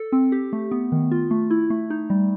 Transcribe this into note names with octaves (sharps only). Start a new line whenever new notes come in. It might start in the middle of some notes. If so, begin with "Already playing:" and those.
Already playing: A4
C4
G4
A3
B3
D#3
F4
A3
E4
A3
D#4
G3